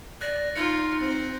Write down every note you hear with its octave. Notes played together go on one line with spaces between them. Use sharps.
D5 F#6 A6 A#6
D#4 F4 C#7
C4 C5